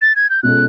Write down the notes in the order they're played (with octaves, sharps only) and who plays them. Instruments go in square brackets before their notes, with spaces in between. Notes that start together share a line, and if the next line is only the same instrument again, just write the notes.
[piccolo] A6
G#6
G6
[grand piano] B2 G#3 C#4 F4 A4 [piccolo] F#6